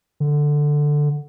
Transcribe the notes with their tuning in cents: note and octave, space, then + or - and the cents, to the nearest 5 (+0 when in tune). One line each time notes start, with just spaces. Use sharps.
D3 +5